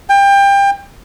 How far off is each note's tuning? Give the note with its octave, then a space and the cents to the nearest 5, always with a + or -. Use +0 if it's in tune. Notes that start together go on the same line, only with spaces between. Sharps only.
G5 +25